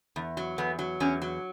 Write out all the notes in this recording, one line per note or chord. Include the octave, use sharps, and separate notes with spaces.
E2
F#3
E2 B3
F#3
E2 C#4
F#3